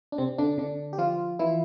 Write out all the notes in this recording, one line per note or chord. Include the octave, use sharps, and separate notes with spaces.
D4
C3 C4
D3 D4
D3 D4
G4
F3 F4
E3 E4